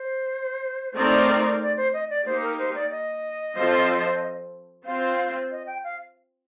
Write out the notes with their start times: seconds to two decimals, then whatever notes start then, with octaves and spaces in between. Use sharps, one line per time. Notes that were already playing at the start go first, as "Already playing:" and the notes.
Already playing: C5
0.96 A3 C4 D#4 A#4 D5
1.61 D5
1.77 C5
1.93 D#5
2.10 D5
2.26 A#3 D#4 G4 C5
2.42 A#4
2.59 C5
2.75 D5
2.91 D#5
3.56 F3 C4 F4 A4 C5
4.85 C4 F4 C5 F5
5.51 D#5
5.67 G5
5.84 F5